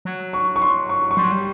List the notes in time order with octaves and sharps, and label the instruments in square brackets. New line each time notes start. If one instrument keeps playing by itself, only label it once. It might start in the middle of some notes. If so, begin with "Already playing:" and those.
[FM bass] F#3
[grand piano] C#6
C#6
C6
C#6
C#6
[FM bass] G3 [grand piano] C6
[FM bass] F#3
G3